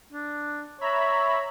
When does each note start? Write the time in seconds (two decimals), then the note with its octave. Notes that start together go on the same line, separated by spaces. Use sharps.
0.13 D4
0.81 C#5 E5 A#5 B5